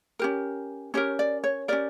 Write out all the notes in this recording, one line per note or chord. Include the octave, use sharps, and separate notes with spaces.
C#4 G4 A#4
C#4 G4 A#4 C#5
D5
C#5
C#4 G4 A#4 D5